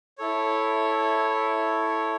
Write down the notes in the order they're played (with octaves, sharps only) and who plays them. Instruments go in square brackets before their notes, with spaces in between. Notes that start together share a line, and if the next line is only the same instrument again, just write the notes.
[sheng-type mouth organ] E4 A4 C#5